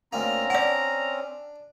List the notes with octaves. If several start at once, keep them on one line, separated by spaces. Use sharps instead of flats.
D2 A#3 C4 C#4 A#5
D4 D5 F#5